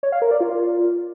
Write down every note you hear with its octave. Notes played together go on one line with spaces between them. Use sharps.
C#5
F5
A#4
D5
F4